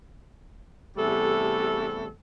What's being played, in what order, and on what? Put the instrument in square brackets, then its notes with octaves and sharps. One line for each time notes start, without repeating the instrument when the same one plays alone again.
[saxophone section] E2 C3 G3 A3 A4